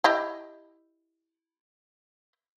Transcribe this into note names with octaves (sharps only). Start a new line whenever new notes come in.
E4 G4 D#5